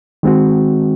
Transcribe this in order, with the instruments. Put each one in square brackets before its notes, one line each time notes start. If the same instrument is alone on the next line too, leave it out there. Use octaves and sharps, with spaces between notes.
[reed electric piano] D#3 G#3 C4 F#4